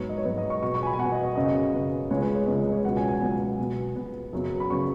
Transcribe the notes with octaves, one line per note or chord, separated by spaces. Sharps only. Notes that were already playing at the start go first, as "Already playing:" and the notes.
Already playing: G#2 F#3 B3 C#5
D#5
C#5
G#2 F#3 B3 B4
D#5
C#6
B2 B3 C#6
C#6
G#5
B5
G#5
B2 F#5
B3
D#5
D#5
F#2 C#3 B3 D#5
F#2 C#3 B3
C#2 C#3 G#3 B3 C#5
B4
C#5
C#2 C#3 G#3 B3 D#5
D#5
C#5
C#2 B2 F#3 B3 F#5
G#5
G#5
C#2 B2 F#3 B3
B2 B3
B2 B3
F#2 C#3 F#3 B3
B5
C#3 F#3 B3 C#6